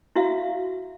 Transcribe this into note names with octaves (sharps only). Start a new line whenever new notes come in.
E4 F#4 E5 F5